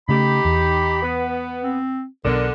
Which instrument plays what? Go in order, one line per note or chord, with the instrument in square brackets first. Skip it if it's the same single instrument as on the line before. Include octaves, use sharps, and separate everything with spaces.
[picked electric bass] C#3 A3 [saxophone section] D#4 G4 [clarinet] B5
[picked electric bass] E2
[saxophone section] B3
[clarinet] C4
[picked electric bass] B1 B2 [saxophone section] D3 [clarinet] A#4